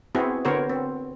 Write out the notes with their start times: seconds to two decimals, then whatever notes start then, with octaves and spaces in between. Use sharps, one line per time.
0.15 B3 C4 E4 F#4 G#4
0.45 D3 B3 F#4 A#4 C5 C#5
0.69 C4